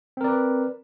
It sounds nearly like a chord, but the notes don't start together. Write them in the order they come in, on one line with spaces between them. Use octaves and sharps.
C4 A#4 D5 B4